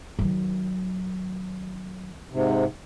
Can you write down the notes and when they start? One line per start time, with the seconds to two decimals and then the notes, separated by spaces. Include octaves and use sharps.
0.19 D#3 F#3
2.32 G#2 C3